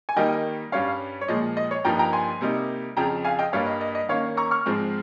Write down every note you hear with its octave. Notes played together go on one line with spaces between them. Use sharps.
G#5
D#3 G3 A#3 D#4 D#5 G5
G2 G3 C#4 C#5 F5
C#5
A#2 F3 G#3 D#5
D#5
C#5
G2 F3 A#3 D#4 G5 A#5
G5 A#5
G#5 C6
C3 G3 A#3 D#4
F2 C#3 F3 G5 A#5
F5 G#5
D#5 G5
G2 G3 A#3 C#5 F5
D#5
D#5
D#5
D#3 A#3 C#4 C#5 F5
A#5 C#6
C#6 F6
G#2 F3 G#3 C4